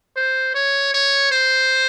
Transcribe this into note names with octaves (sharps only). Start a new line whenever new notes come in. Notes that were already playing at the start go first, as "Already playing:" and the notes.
C5
C#5
C#5
C5